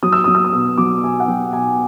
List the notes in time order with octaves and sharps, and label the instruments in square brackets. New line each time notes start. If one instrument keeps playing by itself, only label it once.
[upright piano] F#3 D#6
E6
F#3 D#6
E6
D#6
B2
F#3 D6
B2 G#5
F#5
F#3 G5
B2 G#5